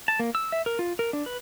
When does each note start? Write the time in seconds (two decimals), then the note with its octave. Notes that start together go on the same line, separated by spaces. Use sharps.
0.08 A5
0.19 A#3
0.35 E6
0.52 E5
0.66 A#4
0.79 F4
0.99 A#4
1.13 D4
1.26 B4